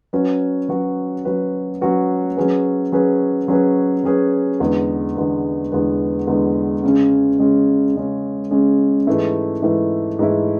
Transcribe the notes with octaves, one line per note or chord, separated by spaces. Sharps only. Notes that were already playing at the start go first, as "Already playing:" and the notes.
F#3 C#4 F#4 B4
F#3 C#4 F#4 B4
F#3 C#4 F#4 B4
F#3 C#4 F#4 B4
F#3 C#4 G#4 B4
F#3 C#4 G#4 B4
F#3 C#4 G#4 B4
F#3 C#4 G#4 B4
E2 D3 G#3 B3
E2 D3 G#3 B3
E2 D3 G#3 B3
E2 D3 G#3 B3
C#3 G#3 C#4
C#3 G#3 C#4
C#3 G#3 C#4
C#3 G#3 C#4
G#2 E3 A3 E4
G#2 E3 A3 E4
G#2 E3 A3 E4